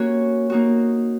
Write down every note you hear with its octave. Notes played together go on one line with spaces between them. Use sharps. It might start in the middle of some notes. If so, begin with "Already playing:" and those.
Already playing: A#3 C#4 F#4 C#5
A#3 D#4 F#4